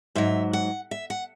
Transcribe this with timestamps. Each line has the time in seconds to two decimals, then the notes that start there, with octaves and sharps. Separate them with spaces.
0.15 G#2 F#3 E5
0.53 F#5
0.91 E5
1.10 F#5